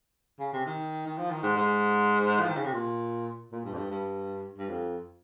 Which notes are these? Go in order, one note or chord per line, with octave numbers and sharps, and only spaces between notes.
C#3
C3
D#3
D#3
F3
D#3
G#2
G#2
F3
D#3
C#3
C3
A#2
A#2
G2
F2
G2
G2
G2
F2